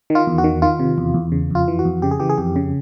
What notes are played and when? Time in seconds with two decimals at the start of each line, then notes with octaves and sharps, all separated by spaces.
0.10 D#3
0.15 F4
0.27 E2
0.38 F#4
0.44 D#3
0.62 D#3 F4
0.80 C3
0.98 E2
1.14 E2
1.32 C#3
1.51 F2 F4
1.68 E3
1.79 F#4
1.85 F2
2.02 C#3 G4
2.11 G#4
2.20 E3 G4
2.30 G#4
2.38 F2 G4
2.56 C#3